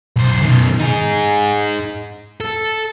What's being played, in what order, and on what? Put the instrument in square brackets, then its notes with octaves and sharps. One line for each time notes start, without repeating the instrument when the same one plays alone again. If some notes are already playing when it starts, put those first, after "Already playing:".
[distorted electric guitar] B1 C5
B2 D#3
D#4 G#4
A4